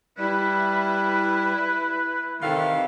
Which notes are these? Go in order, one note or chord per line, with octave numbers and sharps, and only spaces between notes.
G3 E4 B4
C3 D#3 E3 A4 F5